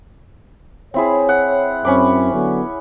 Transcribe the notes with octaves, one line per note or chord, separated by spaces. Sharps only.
C4 E4 G#4 C#5
F#5
F#2 C4 C#4 B5 D6
D3 F#3 B3